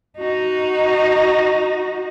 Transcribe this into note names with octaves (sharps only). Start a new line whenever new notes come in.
D#4 F#4